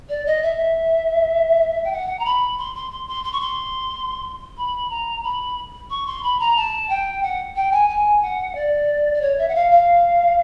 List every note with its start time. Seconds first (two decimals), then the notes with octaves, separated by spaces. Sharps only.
0.09 D5
0.26 D#5
0.42 E5
1.84 G5
1.92 F#5
2.19 A#5
2.25 B5
2.58 C6
2.75 C6
2.91 C6
3.07 C6
3.24 C6
3.32 C#6
3.40 C6
4.57 B5
4.89 A#5
5.23 B5
5.90 C#6
6.06 C6
6.23 B5
6.39 A#5
6.56 A5
6.89 G5
7.22 F#5
7.56 G5
7.71 G#5
7.89 G#5
8.22 F#5
8.55 D5
9.14 D5
9.21 C#5
9.38 E5
9.48 F#5
9.55 F5
9.71 F5